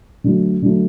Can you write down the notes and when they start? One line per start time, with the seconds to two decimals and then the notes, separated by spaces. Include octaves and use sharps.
0.24 D3 F#3 A3
0.62 D3 F#3 A3